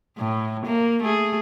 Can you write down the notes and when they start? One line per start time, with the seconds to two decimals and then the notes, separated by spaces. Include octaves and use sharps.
0.18 A2
0.65 A#3
1.02 A3 G#4